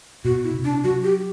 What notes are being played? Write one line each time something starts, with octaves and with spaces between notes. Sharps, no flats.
B2 F#4
E4
C3
D4
F#3 F#4
G4